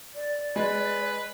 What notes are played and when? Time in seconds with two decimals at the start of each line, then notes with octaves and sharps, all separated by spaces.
0.15 D5
0.56 G#3 B4